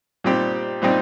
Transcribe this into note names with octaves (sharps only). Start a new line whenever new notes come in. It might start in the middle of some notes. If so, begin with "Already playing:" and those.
A#2 G3 C4 D#4 G4
A#2 G3 C4 D#4 G4